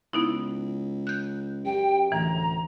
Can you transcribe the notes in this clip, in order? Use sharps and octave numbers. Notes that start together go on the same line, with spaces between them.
C#2 B3 D#4 E4
F#6 G6
F#2 G4 G5
D2 A2 E3 A#5